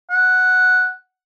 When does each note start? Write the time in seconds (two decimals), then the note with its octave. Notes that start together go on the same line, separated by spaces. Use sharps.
0.11 F#5